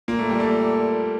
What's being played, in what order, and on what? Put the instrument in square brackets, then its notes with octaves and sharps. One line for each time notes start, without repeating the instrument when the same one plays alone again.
[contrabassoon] A#2 [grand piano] A#3
[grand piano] A3
G3
A3